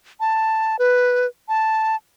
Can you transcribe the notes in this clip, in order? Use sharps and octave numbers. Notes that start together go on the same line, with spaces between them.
A5
B4
A5